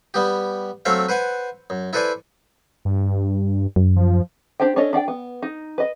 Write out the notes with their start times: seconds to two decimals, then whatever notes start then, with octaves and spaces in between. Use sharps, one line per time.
0.14 G3 B3 G4
0.85 F#3 A3 C4 A4 E5 F5
1.09 B4 C5 F#5 G#5
1.70 F#2
1.93 E4 A4 B4 C5 D5 G#5
2.85 G2
3.76 F#2
3.96 F3
4.60 D4 G4 C5 G5
4.76 C#4 D4 A4 C#5 D#5
4.93 D4 D5 F#5 G5
5.08 B3
5.42 D#4
5.78 B4 D#5